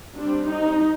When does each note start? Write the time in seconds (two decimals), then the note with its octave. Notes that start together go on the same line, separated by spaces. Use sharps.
0.16 G3 C4 D4
0.48 D#4